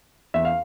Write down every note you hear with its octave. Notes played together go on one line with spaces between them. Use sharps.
E2 E5
F5